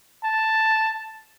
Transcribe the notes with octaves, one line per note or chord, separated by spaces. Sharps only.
A5